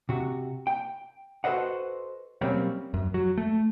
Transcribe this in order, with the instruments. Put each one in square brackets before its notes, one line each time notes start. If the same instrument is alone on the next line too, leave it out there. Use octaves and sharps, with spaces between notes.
[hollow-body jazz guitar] C3 F#4
G5
F#4 A4 B4 C5 D#5 F#5
B2 F#3 G3 A#3 C4 C#4
[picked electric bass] F#2
F#3
A3